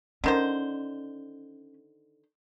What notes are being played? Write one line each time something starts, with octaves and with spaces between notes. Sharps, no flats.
D3 D#3 C#4 C5